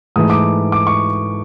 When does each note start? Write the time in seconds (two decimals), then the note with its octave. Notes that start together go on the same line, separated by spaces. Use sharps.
0.16 G#2 E3 A3 D#6
0.30 D6
0.72 D6
0.87 C#6